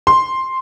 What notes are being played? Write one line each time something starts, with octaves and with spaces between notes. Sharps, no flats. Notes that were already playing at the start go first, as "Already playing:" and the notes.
C6